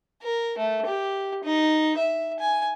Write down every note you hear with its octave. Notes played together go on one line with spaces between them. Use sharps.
A#4
A3
G4
D#4
E5
G#5